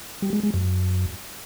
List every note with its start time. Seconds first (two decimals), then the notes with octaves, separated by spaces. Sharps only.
0.22 G3
0.33 G#3
0.43 G#3
0.54 F#2